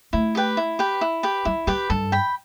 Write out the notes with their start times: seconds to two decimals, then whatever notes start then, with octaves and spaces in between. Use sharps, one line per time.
0.13 A3 E4
0.35 G4 B4 G5
0.57 E4
0.79 G4 B4 G5
1.01 E4
1.23 G4 B4 G5
1.45 G3 E4
1.67 G3 G4 B4 G5
1.90 G2 A4
2.12 G5 B5